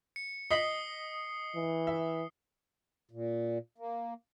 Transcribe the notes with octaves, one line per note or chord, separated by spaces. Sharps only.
C#7
D#5 D#6 B6 C7 F#7 G7
E3
E5
A#2
A#3